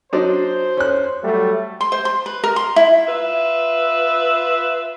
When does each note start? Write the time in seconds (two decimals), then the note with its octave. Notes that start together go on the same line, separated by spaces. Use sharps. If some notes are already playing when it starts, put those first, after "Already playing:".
0.13 F#3 D4 D#4 C5
0.77 C#4 F#6
1.22 F#3 G3 A3
1.81 C6
1.92 C5
2.05 C6
2.26 B4
2.44 A#4
2.56 C6
2.76 E4
3.08 F4 B4 E5